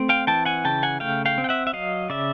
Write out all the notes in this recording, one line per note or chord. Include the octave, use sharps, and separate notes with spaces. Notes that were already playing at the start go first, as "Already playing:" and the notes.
Already playing: A3 C4
F5 G5
E3 G5 A5
F#5 G#5
C#3 G5 A5
F#5 G#5
A3 F5 G5
F5 G5
C4
G5
E5 F#5
E5
F#3 D#5 F5
C#3 D5 E5